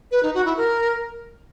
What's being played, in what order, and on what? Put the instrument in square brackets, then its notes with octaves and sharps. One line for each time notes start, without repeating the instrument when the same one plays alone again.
[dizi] B4
D#4
F#4
E4
A#4